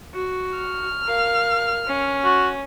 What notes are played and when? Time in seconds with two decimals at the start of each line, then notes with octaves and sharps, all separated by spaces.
0.14 F#4
0.58 F6
1.06 A#4 F5
1.87 C#4
2.24 F#4